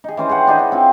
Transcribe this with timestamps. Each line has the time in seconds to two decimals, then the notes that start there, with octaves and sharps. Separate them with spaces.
0.04 D#4 G#4
0.17 E3 C#4 C5
0.29 G#4 C5 F#5 G5
0.47 D4 D#4 G#4 B5
0.59 D#4
0.72 C4 F4